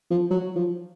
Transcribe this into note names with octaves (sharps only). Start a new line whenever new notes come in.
F3
F#3
F3